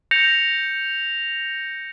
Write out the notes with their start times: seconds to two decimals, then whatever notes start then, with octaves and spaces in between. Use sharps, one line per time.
0.11 G6 A#6 C#7 F7